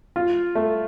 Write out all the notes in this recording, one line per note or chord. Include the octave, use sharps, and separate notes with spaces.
F4
A3